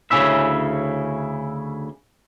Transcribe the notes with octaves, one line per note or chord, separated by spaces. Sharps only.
D2 C#3 F3 C#4 E4 E5